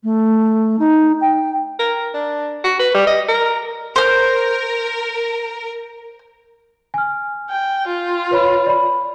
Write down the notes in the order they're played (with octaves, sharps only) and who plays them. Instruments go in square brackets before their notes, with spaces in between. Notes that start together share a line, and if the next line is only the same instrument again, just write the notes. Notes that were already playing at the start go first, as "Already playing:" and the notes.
[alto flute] A3
D#4
G5
[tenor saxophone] A#4
D4
F#4
B4
G3
D#5
A#4
[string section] A#4 [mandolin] C5 F6
[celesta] G#5 F6
[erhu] G5
F4
[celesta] B4 C#5 B5
D5 B5